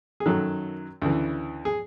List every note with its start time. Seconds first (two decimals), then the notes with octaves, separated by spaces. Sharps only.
0.20 G#4
0.26 F#2 D#3 F#3 A4
1.02 D2 C#3 E3
1.65 G#4